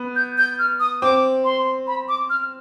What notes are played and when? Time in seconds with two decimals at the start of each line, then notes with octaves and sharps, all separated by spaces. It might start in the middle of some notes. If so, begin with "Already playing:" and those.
Already playing: B3
0.16 G6
0.38 G6
0.59 F6
0.80 D#6
1.02 C4 D6
1.44 C6
1.87 B5
2.09 D6
2.30 F6